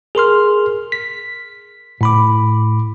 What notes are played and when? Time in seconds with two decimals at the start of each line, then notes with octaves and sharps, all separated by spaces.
0.15 G#4 A#4 C6 F6
0.92 B6
2.01 A2 B5 D6